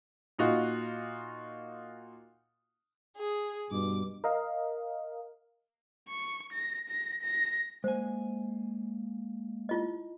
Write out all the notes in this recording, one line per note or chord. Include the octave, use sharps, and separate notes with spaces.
A#2 D#4 F4 F#4
G#4
G2 B2 D6
A#4 D#5 F5
C#6
A#6
A#6
A#6
G#3 A#3 C5 G#5
E4 F4 D#5